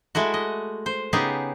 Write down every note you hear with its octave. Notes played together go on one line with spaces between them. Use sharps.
G#3 A3 E4 F#4
D#5
C5
C#3 B3 D#4 G4 G#4